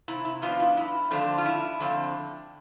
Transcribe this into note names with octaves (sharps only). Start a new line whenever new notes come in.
C3 E4
E4
F3 B3 D4 F4
E4
G2 E4
D3 F3 A3 C4 D4
F4
G2 E4
D3 F3 A3 C4